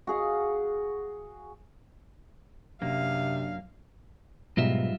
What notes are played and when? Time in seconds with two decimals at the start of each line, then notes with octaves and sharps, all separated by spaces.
0.07 F#4 G#4 F5
2.82 F#2 C3 A#3 D4 F5
4.57 G#2 B2 F#3 G3 D#4 F4 E5